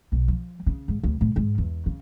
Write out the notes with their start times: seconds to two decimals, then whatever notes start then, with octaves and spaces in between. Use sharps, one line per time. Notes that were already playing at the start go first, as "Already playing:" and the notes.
0.12 B1
0.28 F3
0.66 C#3
0.88 G#2
1.03 D2
1.21 A2
1.36 G#2
1.58 E2
1.86 C#3